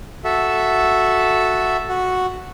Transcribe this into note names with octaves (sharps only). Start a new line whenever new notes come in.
F#4 A4 E5
F#4